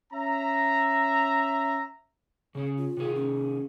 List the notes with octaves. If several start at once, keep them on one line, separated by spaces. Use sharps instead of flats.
C#4 E5 A#5
C#3 C#4 G#4
F4
C3 D#3 G#4
C#4